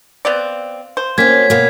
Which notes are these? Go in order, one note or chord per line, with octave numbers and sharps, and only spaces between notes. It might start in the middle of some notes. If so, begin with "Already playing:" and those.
B3 C4 D5 F5
C5
A#3 C4 C#4 F#4 G5 G#6 B6
B2 A#3